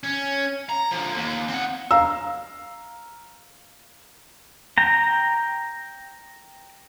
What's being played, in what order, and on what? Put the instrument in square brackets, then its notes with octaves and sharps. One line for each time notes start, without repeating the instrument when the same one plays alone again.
[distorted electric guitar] C#4
A#5
D3 F3
D#2
C4 F#5
[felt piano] F5 A#5 E6
[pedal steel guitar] G5 A#5